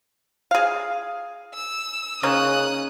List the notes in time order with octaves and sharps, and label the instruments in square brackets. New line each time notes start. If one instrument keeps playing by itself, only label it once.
[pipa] G#4 F5
[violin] E6
[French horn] C#3 [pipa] A#3 C#4 D#4 [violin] D#6 F#6